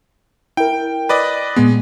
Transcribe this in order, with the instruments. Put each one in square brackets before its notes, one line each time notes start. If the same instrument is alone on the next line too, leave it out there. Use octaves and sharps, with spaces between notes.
[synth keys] E4 A#4 [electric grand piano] G5
[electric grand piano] B4 D5 D#5
[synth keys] A#2 B3 [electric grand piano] G#3